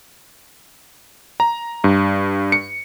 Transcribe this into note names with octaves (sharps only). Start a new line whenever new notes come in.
A#5
G2
C#7